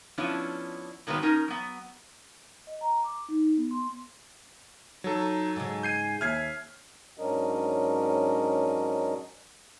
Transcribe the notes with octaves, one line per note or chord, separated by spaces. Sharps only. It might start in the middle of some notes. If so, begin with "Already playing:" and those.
F3 B3 C#4 D4 E4
G#2 D3 D#3 F#3 B3
C#4 D#4 A#4
F#3 B3
D#5
A#5
D6
D#4
B3
C6
F#3 D#4 A4
G#2 C#3
G#5 G6 C7 D#7
D#2 E5 F6 G#6 C7
G#2 F#3 C#4 D4 A#4 D#5